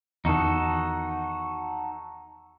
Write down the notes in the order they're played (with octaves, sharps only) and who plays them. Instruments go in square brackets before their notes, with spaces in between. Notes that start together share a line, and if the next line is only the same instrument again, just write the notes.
[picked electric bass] E2 D#3 [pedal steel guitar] D#4 F#4 A4